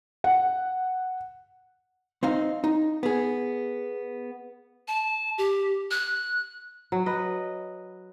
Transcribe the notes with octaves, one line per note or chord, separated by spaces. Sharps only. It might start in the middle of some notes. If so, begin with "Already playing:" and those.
F#5
C4 D#4 F5
D#4
B3 G#4
A5
G4
F#6
F#3
B4 D#5